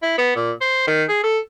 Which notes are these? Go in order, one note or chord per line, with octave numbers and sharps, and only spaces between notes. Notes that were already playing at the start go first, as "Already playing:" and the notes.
E4
B3
A#2
C5
D#3
G#4
A4